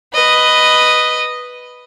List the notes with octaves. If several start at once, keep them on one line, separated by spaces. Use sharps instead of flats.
B4 D#5